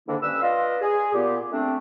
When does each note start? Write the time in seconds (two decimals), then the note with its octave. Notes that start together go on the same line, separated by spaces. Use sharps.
0.07 G#2 D3 D#3 A#3 D4 E4
0.22 G2 C#4 B4 E6
0.42 F4 B4 D5 D#5 F5
0.82 G#4
1.14 A#2 B3 G4
1.52 A3 C4 D4